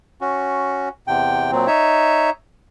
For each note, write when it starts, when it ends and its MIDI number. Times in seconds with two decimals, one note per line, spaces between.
0.21 0.89 61
0.21 0.89 66
1.07 1.51 40
1.07 1.51 48
1.07 1.51 79
1.52 1.67 46
1.52 1.67 54
1.52 1.67 60
1.67 2.30 63
1.67 2.30 73
1.67 2.30 76